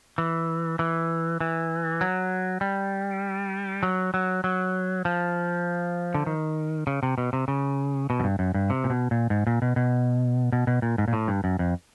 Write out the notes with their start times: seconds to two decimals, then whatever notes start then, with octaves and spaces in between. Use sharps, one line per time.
0.18 E3
0.79 E3
1.40 E3
2.01 F#3
2.61 G3
3.83 F#3
4.14 F#3
4.44 F#3
5.05 F3
6.15 D3
6.27 D#3
6.87 C#3
7.03 C3
7.18 B2
7.33 C3
7.48 C#3
8.10 B2
8.20 F#2
8.24 G2
8.39 F#2
8.54 G2
8.70 C3
8.84 A#2
8.90 B2
9.11 A#2
9.30 G#2
9.47 A#2
9.62 B2
9.76 B2
10.52 B2
10.67 B2
10.82 A#2
10.98 G#2
11.08 A#2
11.13 A2
11.28 G2
11.44 F#2
11.59 F2